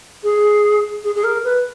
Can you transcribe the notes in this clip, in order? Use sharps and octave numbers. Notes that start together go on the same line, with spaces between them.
G#4
G#4
G#4
A#4
B4